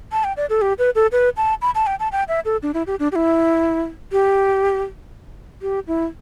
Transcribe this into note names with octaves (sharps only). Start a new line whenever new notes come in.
A5
G5
D5
A4
G4
B4
A4
B4
A5
B5
A5
G5
A5
G5
E5
A4
D4
E4
G4
D4
G4
E4
G4
G4
E4